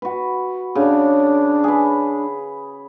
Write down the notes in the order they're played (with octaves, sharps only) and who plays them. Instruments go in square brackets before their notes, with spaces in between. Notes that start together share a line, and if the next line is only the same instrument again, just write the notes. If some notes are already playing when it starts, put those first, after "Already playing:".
[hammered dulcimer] F#4 B4
[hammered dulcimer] C#3 [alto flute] D4
[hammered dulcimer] G#4 B4